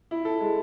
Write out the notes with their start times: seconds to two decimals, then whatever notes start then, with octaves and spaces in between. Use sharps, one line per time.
0.11 E4
0.25 A4
0.41 G#3